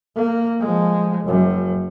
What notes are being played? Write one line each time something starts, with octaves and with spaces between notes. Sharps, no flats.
A#3
F3 G#3
F#1 F#2